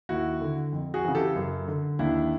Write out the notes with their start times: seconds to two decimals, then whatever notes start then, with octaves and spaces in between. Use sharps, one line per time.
0.09 D#2 E4 F#4
0.41 D3
0.73 F2
0.94 F#4 G#4
1.04 C#3 E3
1.15 G4 A4
1.36 F#2
1.68 D3
1.99 D#2 D4 E4